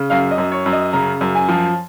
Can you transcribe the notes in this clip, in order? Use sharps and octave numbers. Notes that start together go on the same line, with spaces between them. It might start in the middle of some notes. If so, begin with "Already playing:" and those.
Already playing: C#3
F#2 F5
D#5
F#2
C#5
F#2
D#5
C#3 A#5
F#2
G#5
F3